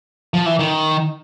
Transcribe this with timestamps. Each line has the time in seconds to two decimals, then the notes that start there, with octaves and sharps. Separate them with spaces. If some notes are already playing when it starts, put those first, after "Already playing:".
0.34 F3
0.46 E3
0.59 D#3